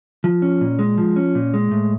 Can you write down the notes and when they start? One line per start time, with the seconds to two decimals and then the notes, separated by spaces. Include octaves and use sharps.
0.24 F3
0.42 C#4
0.61 A#2
0.79 G#3
0.98 F3
1.16 C#4
1.35 A#2
1.54 G#3
1.71 A2